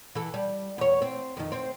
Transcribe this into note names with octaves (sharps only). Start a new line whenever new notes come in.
E3 A4
G3
E2 C#5
C4
F2 D#3
C4 C5